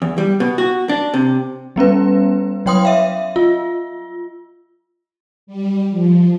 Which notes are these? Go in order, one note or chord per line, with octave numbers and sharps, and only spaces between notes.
E2
G3
B2
F#4
D4
C3
G3 B3 C#4 B4
F#3 C#5 G5 C6 D#6
E5 F5
F4
G3
F3